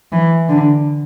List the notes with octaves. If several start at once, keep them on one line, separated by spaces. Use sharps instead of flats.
E3
D3